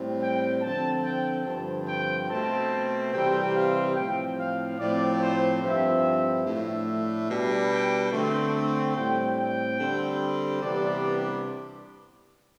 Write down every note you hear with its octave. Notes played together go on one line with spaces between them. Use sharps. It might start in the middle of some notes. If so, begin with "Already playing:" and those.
Already playing: A2 G3 C4
G5
D3 F3 C4 A5
G5
G2 D3 F3 C4 A5
G5
B2 A3 C4 A5
C3 E3 G3 C4 G5
F5
A2 F3 C4 G5
F5
A2 F3 C4 D5
C5
G2 F3 C4 E5
A2 F3 A3 D4 E5
B2 G3 D4
G5
D3 A3 C4
A2 G3 C4 G5
G5
D3 G3 C4
C3 E3 G3 B3 D4 D5